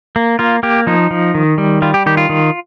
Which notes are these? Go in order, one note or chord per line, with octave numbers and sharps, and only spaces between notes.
A#3
A#3 F4
A#3 G4
F3 D#4
F3
D#3
G3
G3 F4
G4
D#3 G4
F4
D#3